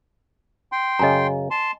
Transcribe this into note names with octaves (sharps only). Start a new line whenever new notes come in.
G5 C6
F#2 C#3 D#5 G#5 A#5
A5 C6